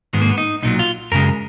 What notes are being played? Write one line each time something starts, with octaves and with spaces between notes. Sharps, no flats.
G#2 D#3 G#3 B3
A#3
B3
D#4
B1 A#2 F#3 D#4
F4
F#2 C#3 G#3 A#4